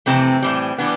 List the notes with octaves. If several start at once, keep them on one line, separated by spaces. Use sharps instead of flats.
F2 C3 E3 A3 C4
A2 E3 G3
A2 E3 G3 B3 D4